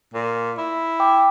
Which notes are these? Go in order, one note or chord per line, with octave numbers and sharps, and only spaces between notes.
A#2
E4
G5 D6